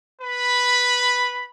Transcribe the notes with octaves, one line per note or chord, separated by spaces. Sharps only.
B4 B5